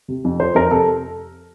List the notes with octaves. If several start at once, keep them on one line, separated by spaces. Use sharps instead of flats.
C3
F2
F3 C5
F2 A#4
C3 A4